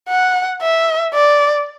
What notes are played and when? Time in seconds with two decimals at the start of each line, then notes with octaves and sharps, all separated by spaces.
0.09 F#5
0.62 E5
1.14 D5